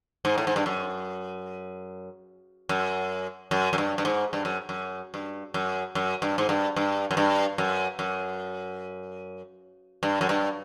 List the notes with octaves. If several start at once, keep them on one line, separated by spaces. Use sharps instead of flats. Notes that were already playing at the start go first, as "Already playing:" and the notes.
G#2
A2
G#2
G2
F#2
F#2
F#2
F#2
G2
G2
G#2
G2
F#2
F#2
G2
F#2
F#2
G2
G#2
G2
G2
F#2
G2
F#2
F#2
G2
F#2
G2